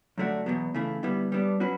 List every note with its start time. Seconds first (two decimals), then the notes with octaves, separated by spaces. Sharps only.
0.18 F#2 D3 A3 D4 F#4
0.46 E2 B2 F#3 B3
0.74 C#3 E3 A3 E4
1.03 D3 G3 B3 E4
1.32 G3 B3 D4
1.60 F#3 C#4 F#4 B4